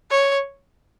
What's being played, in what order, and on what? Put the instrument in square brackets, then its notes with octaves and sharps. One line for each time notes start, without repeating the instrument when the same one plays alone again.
[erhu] C#5